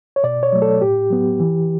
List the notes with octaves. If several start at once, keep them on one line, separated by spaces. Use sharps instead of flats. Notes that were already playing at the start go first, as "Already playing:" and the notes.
C#5
B2 D5
C#5
F#3 A3
A4
A2 G4
F#3 B3
E3